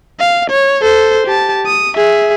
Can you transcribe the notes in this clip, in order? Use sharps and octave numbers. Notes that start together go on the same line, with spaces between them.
F5
C#5
A4 C5
G4 A5
D#6
G#4 E5